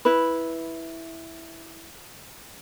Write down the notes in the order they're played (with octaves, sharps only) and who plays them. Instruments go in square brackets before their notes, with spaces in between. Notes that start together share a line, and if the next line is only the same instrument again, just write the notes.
[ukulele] E4 B4